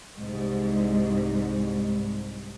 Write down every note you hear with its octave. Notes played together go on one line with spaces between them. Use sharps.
C2 G#2